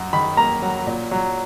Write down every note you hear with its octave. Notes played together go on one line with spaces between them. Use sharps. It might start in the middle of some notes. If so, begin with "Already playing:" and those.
Already playing: F#2
D#3 B5
A#3 A#5
F#3
A#2
F#3